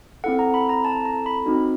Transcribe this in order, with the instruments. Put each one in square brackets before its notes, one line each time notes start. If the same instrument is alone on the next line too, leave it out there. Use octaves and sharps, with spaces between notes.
[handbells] C4 E4 A4 F#5
A#5
B5
A#5
A5
A#5
B5
C4 D#4 F#4